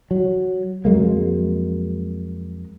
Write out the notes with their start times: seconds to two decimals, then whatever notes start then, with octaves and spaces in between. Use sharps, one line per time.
0.11 F#3
0.85 F2 F#3 G#3 A#3